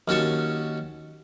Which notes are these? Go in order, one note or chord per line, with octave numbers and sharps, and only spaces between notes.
D#2 C#4 F#4 A5 C#6